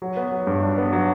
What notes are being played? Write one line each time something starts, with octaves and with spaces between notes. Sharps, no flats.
F#3
B3
F#3
G2
D4
B3
F#3